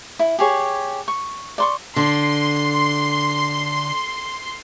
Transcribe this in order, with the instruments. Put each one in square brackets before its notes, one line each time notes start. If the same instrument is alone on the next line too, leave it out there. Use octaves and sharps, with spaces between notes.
[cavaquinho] E4
G4 G#4 C#5
C#6
D5 C6 C#6
[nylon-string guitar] D3 [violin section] C6